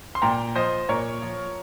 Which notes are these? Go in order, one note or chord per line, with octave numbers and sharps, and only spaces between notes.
C6
A#2 G5 A#5
F3 C5 D#5
A#2 A#4 C#5
F3